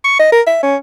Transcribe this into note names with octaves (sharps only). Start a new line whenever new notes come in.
C#6
D#5
A#4
E5
C#4